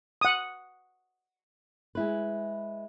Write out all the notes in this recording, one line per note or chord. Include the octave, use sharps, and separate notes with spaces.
F#5 D#6
G#3 E4 B4